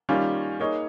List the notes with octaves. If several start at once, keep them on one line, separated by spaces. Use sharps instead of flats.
D#3 G3 A#3 C#4 F4
A#3 D#4 G#4 C#5